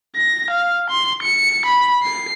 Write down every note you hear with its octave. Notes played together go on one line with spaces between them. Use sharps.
A#6
F5
C6
C#7
B5
C7